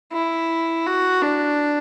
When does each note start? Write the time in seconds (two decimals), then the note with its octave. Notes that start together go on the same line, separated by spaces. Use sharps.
0.12 E4
0.86 F#4
1.22 D4